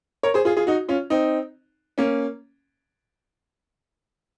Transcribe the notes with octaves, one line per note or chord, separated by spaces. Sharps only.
A#4 C#5
G#4 C5
F4 G#4
F4 G#4
D#4 F#4
C#4 F4
C4 D#4
A#3 C#4